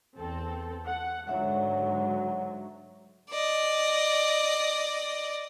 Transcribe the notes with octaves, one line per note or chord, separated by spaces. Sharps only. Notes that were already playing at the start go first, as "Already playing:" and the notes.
E2 C4 A4
F#5
G#2 D3 F#3 C#5 E5 F#5
D5 D#5